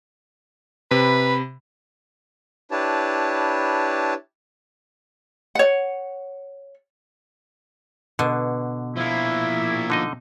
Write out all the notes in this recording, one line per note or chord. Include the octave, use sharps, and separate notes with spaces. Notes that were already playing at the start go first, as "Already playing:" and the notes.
C3 B4 B5
D4 E4 G4 B4 C#5 A5
C#5 F#5
B2 D3
F3 A#3 E4
D3 D#4 D#5